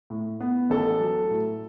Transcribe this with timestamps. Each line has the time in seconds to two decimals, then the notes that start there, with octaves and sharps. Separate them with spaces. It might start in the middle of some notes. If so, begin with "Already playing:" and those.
0.10 A2
0.40 B3
0.70 A1 A4
1.01 F#3
1.31 A2